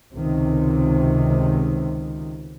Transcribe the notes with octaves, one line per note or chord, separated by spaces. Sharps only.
C#2 C3 D#3